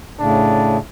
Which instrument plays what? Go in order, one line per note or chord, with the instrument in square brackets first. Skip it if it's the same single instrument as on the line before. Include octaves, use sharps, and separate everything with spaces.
[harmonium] A2 C#3 [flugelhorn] D4